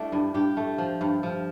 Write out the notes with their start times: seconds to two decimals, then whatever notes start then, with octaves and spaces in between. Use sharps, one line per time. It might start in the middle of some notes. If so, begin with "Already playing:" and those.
Already playing: G3 A3 D4 E4
0.12 G2
0.34 G2 G4
0.57 A3
0.78 F3
1.01 G2
1.23 F3